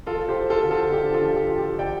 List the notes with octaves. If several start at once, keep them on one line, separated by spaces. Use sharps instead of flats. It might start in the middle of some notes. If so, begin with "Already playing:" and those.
F3 F4 A4
G4 C5
F4
F4 A4
D3
F4 A4
D4 G4
F4 A4
F3
G4
F4
G4
D3 D5 G5